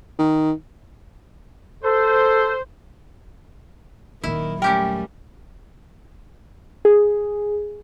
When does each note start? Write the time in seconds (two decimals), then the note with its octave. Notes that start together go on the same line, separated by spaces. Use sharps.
0.19 D#3
1.83 A4 C5
4.23 D#1 D#3 F#3 E4
4.62 G3 A3 C#4 G4 A#4 G5
6.85 G#4